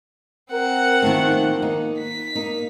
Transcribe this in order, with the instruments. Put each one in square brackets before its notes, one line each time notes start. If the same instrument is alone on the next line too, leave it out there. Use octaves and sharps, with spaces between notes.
[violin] C4 F#5 [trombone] A#4
[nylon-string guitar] D#3 F3 A3 [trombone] A#3
[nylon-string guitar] D#4
[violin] B6
[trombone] A#3 [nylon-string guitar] D#4